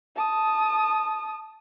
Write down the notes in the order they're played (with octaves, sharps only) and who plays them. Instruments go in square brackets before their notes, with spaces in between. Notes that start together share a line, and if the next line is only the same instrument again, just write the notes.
[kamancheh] A5 D#6